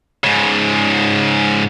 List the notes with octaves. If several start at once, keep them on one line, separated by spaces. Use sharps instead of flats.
G#2 C#3